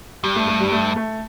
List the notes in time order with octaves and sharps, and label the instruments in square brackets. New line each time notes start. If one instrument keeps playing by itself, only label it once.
[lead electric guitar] G2 [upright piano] G3
[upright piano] A3
A3
G3
A3
A3